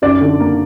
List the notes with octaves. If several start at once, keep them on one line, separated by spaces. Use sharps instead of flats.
F#2 D5
D3
A#3